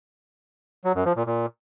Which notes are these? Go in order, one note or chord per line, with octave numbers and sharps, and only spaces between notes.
F#3
F#2
F3
A#2
A#2